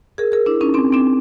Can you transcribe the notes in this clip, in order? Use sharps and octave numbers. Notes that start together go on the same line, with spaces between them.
G#4 A#4
G#4 A#4
D4 E4
C#4 D#4
C4 D4
C4 D4